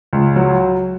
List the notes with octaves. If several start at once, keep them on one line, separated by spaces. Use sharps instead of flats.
C#2
F#3